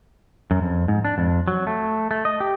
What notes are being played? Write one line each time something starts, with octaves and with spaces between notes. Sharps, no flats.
F#2
F2
G#2
D4
F2
F#3
A3
A3
D#5
G4